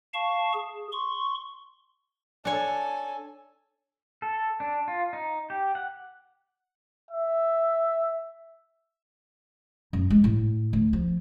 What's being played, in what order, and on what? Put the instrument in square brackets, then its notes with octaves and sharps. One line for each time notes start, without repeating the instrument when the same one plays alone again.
[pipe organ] F5 A5 C#6
G#4
C6 C#6
[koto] D4 C#5 [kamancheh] A4 G#5
[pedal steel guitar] A4
D4
F4
D#4
G4
F#5
[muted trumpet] E5
[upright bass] F#2
G#3
A2
D2
F3